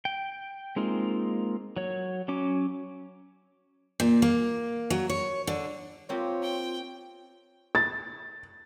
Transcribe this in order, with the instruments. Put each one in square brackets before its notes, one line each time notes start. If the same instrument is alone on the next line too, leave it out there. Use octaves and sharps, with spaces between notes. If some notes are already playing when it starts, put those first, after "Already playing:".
[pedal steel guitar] G5
G#3 A#3 C4 D#4 F4
F#3 C#5
F#3 C#4 D6
[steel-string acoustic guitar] A#2
A#3
F#3
C#5
D3
[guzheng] A#3 C4 G4 [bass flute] F4 [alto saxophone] C#5
[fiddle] G5
[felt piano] A6